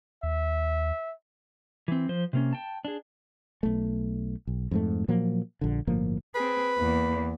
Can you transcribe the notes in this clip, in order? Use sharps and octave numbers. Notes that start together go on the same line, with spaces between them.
D#2 E5
E3 C4
F3 C5
C3 A#3 C#4
G5 A5
D4 G#4
B1 A3
B1
F2 G#2 A3
A#2 F3 F#3 A#3
A#1 D3
G1 A2 F3 A#3
C4 G#4 B4
E2 A#3